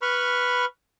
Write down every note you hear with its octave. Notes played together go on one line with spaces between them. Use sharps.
B4 B5 C#6 F6